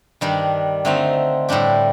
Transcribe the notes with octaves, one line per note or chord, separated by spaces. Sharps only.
G2 D#3 G3 D4
D3 A3 C4 D#4
A2 G3 D4 G4